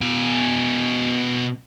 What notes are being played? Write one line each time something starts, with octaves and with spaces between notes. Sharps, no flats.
B2 G#5